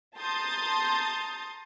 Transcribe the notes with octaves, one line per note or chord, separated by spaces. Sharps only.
A5 A#5 C6 D#6 G6 A6